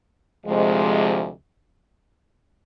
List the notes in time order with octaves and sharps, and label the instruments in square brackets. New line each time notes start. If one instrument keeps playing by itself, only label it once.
[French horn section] D2 C3 F3 G#3